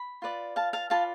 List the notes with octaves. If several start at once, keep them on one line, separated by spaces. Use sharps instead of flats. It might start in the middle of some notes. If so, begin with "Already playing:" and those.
Already playing: B5
F4 B4 D5
F5 A5
F5 A5
F4 B4 D5 F5 A5